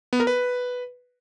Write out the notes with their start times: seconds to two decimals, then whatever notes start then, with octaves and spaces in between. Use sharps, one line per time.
0.13 B3
0.20 A#4
0.27 B4